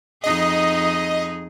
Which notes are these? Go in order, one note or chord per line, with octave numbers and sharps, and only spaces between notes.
F2 D#4 G#4 D#5